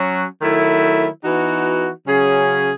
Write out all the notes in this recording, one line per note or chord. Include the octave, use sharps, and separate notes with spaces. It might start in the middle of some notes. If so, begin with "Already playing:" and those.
Already playing: F#3 C#4 F#4
D#3 F#3 A3 E4
E3 B3 D#4 F#4
C#3 F#3 C#4 G#4